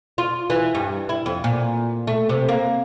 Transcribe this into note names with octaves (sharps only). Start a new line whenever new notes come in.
F4
E3
G2
E4
F2
A#2
A3
C3
A#3